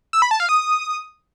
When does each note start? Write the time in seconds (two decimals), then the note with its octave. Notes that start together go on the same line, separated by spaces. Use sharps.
0.13 E6
0.22 B5
0.31 A5
0.40 F5
0.49 D#6